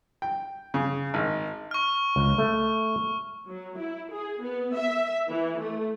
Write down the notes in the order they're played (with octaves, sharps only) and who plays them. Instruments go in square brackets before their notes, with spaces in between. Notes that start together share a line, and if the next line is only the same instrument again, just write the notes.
[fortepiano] G5
C#3
G#1
[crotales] C#6 F6
[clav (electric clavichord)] C#2
A3
[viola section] F#3
E4
G#4
B3
E5
E3
A3